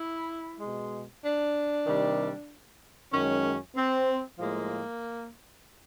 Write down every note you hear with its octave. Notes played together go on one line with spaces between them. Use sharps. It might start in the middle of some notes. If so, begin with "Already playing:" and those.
Already playing: E4
B2 G#3
D4
C3 D#3 G3
F#2 D#3 G#3 C#4
C4
A2 F3 G#3 A#3